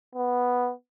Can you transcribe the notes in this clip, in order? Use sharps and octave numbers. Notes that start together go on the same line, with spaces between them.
B3